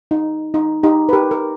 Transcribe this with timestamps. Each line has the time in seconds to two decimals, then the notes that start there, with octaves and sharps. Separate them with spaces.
0.11 D#4
0.54 D#4
0.83 D#4 G4
1.09 B4
1.13 G4 A#4
1.31 A#4